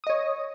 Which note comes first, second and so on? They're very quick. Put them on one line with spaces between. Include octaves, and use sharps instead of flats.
D#6 D#5 C#5